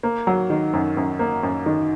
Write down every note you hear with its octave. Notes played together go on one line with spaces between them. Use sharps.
A#3
F#3
D#3
F#2
F#2
A#3
F#2
D#3